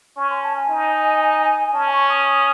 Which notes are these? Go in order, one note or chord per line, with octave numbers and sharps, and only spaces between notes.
C#4 C#6
C6
A5
G#5
D#4
C#4 A5
C#6
D#6